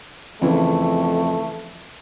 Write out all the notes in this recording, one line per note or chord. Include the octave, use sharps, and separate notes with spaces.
F2 C#3 E3 A3